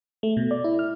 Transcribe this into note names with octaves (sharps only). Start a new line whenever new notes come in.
A3
B2
D5
E4
F6